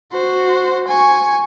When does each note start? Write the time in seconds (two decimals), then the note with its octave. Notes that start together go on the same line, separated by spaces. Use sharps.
0.12 F#4 C5
0.87 G#5 C#6